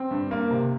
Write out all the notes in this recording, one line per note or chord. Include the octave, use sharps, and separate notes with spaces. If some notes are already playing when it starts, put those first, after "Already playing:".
Already playing: C4
G2
A#3
C3